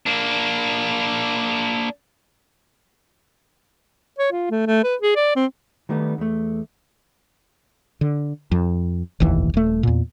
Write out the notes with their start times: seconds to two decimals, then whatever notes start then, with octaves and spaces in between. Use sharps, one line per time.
0.06 A#3 D4
4.19 C#5
4.32 F4
4.51 A3
4.67 A3
4.84 B4
5.02 G#4
5.16 D5
5.36 C4
5.89 D#3 G3 A3 B3
6.18 E2 A3
8.01 D3
8.52 F2
9.20 F1 A#1 D#2 E3
9.54 D#1 A3
9.83 E2 A#2